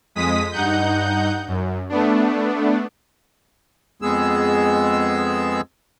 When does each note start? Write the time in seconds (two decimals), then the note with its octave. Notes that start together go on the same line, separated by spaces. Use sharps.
0.15 F2 G#3 D#6 B6
0.52 G2 D#4 F#5 G6
1.48 F#2
1.89 A3 B3 D4
4.02 F2 G#3 B3 G#4 E6